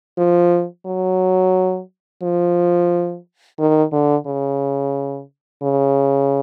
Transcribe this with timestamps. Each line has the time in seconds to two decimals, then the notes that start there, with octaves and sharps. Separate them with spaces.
0.18 F3
0.86 F#3
2.22 F3
3.59 D#3
3.92 D3
4.27 C#3
5.63 C#3